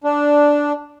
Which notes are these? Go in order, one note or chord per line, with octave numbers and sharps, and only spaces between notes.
D4